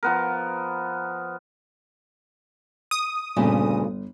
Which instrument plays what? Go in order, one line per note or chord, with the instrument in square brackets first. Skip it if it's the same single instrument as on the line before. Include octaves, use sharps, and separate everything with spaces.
[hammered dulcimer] F3 B3 A#4
[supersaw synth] D#6
[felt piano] G1 [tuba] D2 [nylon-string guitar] G2 A#2 C#3